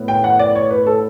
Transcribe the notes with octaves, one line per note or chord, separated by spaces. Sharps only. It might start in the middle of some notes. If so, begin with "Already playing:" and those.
Already playing: A2 B3
G5
F#5
D5
C#5
B4
A4